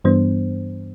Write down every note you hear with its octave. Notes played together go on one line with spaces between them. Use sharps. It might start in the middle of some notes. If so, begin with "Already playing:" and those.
G2 E3 G3 B3 D4 C5